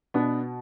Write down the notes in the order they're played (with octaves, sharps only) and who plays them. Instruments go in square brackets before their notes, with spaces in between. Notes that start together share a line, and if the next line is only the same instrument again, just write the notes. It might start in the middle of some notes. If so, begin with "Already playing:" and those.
[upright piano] B2 B3 D4